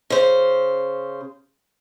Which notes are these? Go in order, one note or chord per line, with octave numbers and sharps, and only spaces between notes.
C#3 C5